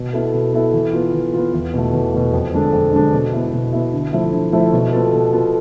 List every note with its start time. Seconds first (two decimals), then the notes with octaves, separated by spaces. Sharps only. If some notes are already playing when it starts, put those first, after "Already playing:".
Already playing: B2
0.13 B3 E4 A4
0.33 B2
0.53 B3 E4 A4
0.73 E3
0.93 B3 F4
1.13 E3
1.33 B3 F4
1.53 E2
1.74 B2 A3
1.93 E2
2.13 B2 A3
2.33 F2
2.53 D3 G#3 D4 A4
2.73 F2
2.93 D3 G#3 D4 A4
3.13 B2
3.33 B3 E4
3.53 B2
3.73 B3 E4
3.93 D3
4.13 F3 A3 E4
4.33 D3
4.53 F3 A3 E4
4.73 B2
4.93 B3 F4 A4
5.13 B2
5.33 B3 F4 A4